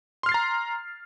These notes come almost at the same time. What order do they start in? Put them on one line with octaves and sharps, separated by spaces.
C6 F6 C7 A6 A#5